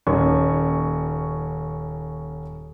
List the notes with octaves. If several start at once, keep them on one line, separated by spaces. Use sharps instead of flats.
D#1 C#4 C#6